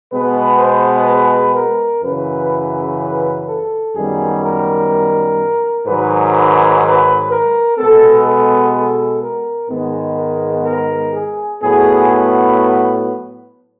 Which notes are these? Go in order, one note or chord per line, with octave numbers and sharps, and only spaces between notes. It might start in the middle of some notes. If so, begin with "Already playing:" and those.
B2 G#3 B3 B4
C5
B4
A#4
F#2 C#3 E3 B4
A4
F#2 D#3 G3 B3 G#4
A#4
G#2 D#3 F#3 B4
B4
B4
A#4
B2 G#3 B3 A4
A4
A4
A#4
G#2 D#3 G#3 B3
A#4
A#4
G#4
A2 F#3 B3 G#4